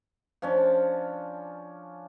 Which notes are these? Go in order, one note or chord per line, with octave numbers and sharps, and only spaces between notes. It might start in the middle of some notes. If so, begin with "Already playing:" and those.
F3 C#4 D4